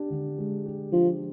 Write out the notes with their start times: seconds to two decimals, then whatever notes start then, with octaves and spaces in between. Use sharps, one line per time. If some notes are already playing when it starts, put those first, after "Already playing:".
Already playing: D4 G4
0.10 D3
0.38 G#3
0.66 G4
0.92 F3 D4